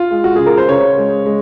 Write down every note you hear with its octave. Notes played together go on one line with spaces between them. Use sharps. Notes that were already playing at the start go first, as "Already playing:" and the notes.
Already playing: F4
G#3
F#4
C#3 G#4
A#4
C5
C#3 C#5
G#3
G#3